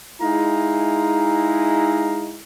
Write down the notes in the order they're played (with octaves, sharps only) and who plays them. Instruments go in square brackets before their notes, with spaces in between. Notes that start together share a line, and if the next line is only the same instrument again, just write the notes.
[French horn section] G#3 E4 [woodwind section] D#4 F5 A#5